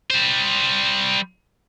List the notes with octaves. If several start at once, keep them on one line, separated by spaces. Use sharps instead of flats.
G3 C5